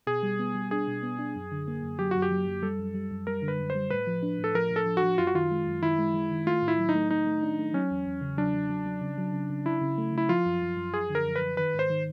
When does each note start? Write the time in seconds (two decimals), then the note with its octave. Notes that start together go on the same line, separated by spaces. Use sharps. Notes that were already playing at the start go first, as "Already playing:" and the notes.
0.07 B2 G#4
0.23 G3
0.39 B3
0.55 G3
0.71 D4 G#4
0.88 B2
1.03 B3
1.19 D4
1.36 F#2
1.52 D3
1.68 A#3
1.82 F#2
1.99 F#3 G4
2.11 F#2 F#4
2.22 G4
2.31 F#3
2.47 F#2
2.62 G3 A4
2.79 F#2
2.94 G3
3.11 F#2
3.27 G3 A#4
3.42 D3
3.48 B4
3.59 F#2
3.70 C5
3.75 G3
3.90 A2 B4
4.07 F3
4.23 D4
4.39 A2 A4
4.54 F3 A#4
4.70 A2
4.76 A4
4.86 F3
4.97 F#4
5.03 F3
5.18 F#2 F4
5.27 F#4
5.35 D#3 F4
5.51 G#3
5.66 F#2
5.82 D#3 E4
5.99 G#3
6.14 G#3
6.31 D#3
6.46 A3 F4
6.62 A2
6.68 E4
6.78 F#3
6.89 D#4
6.95 A3
7.10 A3 D#4
7.26 A3
7.43 D4
7.59 A3
7.74 F#3 C#4
7.91 E2
8.06 E2
8.21 C#3
8.37 F#3 D4
8.54 F#3
8.69 F#3
8.86 F#3
9.02 C#3
9.18 F#3
9.33 C#3
9.50 C#3
9.66 C#3 E4
9.82 C#3
9.98 A3
10.13 C#3 E4
10.29 F3 F4
10.46 F#2
10.62 F#2
10.77 F#2
10.93 F#2 G#4
11.10 D3
11.15 A#4
11.26 F#2
11.36 B4
11.42 F#2
11.57 D#3 B4
11.74 G#2
11.79 C5
11.90 D#3